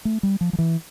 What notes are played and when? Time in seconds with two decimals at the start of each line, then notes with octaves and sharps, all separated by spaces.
0.05 A3
0.23 G3
0.41 F3
0.53 F3
0.59 E3